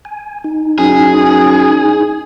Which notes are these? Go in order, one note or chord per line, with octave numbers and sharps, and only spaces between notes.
G#5
D#4
F#2 G#4